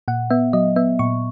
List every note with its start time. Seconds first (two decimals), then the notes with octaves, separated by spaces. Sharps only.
0.08 A#2 F#5
0.30 B3 E5
0.53 F#3 D#5
0.76 B3 E5
0.99 A#2 C#6